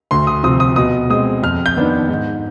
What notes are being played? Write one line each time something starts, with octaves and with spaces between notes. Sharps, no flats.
D2 C6
D#6
C3 F3 C4 D#6
D#6
B2 D#6
G#3 C4 D#6
F2 F6
G6
D#3 B3 D4
G#2